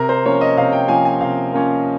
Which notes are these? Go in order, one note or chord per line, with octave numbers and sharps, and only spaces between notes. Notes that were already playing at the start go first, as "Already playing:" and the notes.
Already playing: C3 A#4
C5
F3 A#3 C#4 C#5
D#5
C3 F5
G5
F3 A#3 C#4 G#5
G#5
C3 F5
F3 A#3 C#4